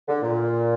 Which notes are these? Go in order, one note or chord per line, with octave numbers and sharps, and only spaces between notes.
D3
A#2